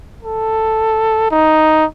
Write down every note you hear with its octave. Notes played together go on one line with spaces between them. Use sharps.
A4
D#4